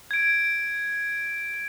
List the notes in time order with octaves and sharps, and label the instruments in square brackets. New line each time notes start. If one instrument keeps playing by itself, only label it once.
[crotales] G#6 D7